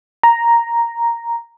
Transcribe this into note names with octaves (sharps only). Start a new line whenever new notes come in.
A#5